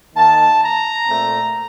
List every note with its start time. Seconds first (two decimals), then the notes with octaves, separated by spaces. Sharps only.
0.15 D#3 A#3 A5
0.61 A#5
1.07 A#2 A3 C4